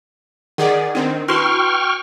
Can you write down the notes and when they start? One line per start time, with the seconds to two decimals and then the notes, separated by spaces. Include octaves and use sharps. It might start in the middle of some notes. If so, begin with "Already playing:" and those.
0.58 D#3 G#4 D5 F#5
0.95 D#3 C4 D4
1.28 E4 F#4 B4 G5 C6 C#6 F6